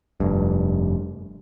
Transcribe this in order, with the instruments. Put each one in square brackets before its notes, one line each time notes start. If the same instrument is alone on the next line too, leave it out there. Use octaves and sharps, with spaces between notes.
[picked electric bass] F1 G2